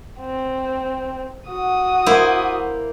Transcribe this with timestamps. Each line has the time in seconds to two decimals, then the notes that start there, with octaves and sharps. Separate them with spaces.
0.20 C4
1.49 F#4 D#6
2.06 A#3 E4 C5